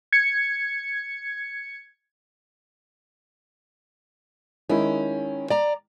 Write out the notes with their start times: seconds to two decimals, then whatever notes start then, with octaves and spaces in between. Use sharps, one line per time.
0.13 G#6 C#7
4.70 D#3 G#3 C#4 E4
5.50 D5 A#5